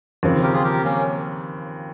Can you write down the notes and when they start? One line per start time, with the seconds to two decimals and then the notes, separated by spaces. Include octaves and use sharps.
0.23 D#2 C#3 F3 C4
0.43 G4 A#4
0.54 F4 G#4
0.64 G4 A#4
0.84 A#3 C#4